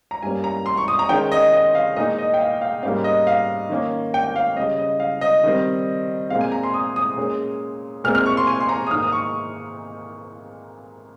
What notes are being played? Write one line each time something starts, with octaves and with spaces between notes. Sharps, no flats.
A#5
G2 G3 A#3 C#4 G#5
A#5
C6
C#6
D#6
A#5
D#3 G#3 C#4 G5
D#5
D#5
F5
A#2 G#3 D#4 D#5
D#5
G5
F5
F5
G#2 G3 A#3 C#4 F5
D#5
F5
D#3 A#3 C#4
G5
G5
F5
C#3 G3 C#4 D#5
D#5
F5
D#5
D#3 G3 C4
A#2 G#3 C4 F5
G#5
A#5
C6
D#6
D#6
A#2 G#3 C#4
A#2 G#3 C4 F6
F6
C#6
C6
G#5
C6
A#5
D#6
G#2 D#3 A#3 D#4 F6
D#6
C#6